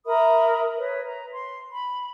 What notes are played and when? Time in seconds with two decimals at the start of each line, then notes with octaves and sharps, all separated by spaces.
0.06 A#4 E5 B5 D#6
0.78 B4 C#5
1.03 A#5
1.31 C6
1.70 B5